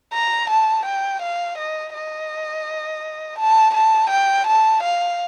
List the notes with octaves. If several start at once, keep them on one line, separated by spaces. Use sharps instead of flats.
A#5
A5
G5
F5
D#5
D#5
A5
A5
G5
A5
F5